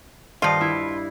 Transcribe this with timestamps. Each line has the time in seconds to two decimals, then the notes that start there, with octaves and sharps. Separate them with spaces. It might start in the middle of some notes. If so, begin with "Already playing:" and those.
0.42 G2 D#3 F3 F4
0.61 E4